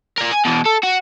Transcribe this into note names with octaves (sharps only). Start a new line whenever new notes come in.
A#4 D5
G#5
B2 E3
A4
F#4